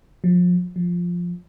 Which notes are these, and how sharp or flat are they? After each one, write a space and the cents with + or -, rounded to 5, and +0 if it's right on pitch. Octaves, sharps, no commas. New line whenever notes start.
F3 +30
F3 +5